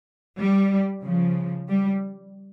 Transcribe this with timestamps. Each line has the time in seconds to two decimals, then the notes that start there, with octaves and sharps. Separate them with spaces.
0.38 G3
1.03 C#3 F3
1.68 G3